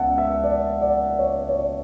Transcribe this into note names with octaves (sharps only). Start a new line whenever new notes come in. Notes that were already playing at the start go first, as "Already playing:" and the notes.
Already playing: C#2 B2 B3 D5 E5 F#5 A5
E5
D5
D5
C#5
C#5
D5